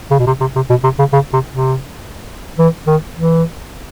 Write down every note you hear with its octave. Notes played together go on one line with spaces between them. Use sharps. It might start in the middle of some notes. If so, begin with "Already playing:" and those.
C#3
B2
C3
C3
C3
B2
C3
C#3
C#3
C3
C3
E3
D#3
E3